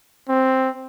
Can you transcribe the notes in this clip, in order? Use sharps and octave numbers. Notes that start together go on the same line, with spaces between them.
C4